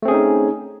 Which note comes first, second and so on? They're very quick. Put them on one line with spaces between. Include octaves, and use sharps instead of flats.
A3 C4 G#4 C#4 D#4